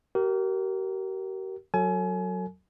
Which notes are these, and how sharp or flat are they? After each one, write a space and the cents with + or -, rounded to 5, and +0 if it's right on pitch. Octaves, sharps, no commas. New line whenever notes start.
G4 -40 A#4 +0
F#3 +0 A4 +35 G#5 +30